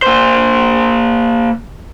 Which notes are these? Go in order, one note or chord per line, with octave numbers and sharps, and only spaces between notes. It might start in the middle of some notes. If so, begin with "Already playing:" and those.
A#3 C5